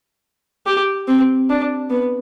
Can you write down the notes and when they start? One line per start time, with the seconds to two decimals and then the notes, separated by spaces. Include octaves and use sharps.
0.66 G4
1.08 C4
1.50 D4
1.90 B3